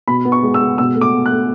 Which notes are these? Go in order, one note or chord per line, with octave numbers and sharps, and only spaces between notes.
B2 B5
B3
C#6
G#3
E6
G#3
B2 E6
A3
D6
B2
F#6
A3